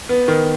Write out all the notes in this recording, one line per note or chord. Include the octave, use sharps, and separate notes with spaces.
B3
D#3